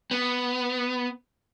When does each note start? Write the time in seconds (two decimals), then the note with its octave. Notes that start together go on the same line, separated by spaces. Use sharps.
0.11 B3